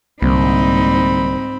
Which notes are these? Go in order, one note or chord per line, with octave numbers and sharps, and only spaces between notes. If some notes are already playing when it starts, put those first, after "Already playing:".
C2 G#2 D3 G3 A#3 C4 D#4 B5